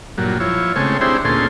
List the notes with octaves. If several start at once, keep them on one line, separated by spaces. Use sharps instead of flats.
G2 A#2 F#3
F3 E4 C#5
C#3 G#3 A3 C4 C#5
C4 D4 E4 G4 G#4 C5
D2 A#2 C#4 G#4 A4 C6